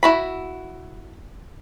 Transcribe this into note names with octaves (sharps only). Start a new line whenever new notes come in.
E4 F#4 B5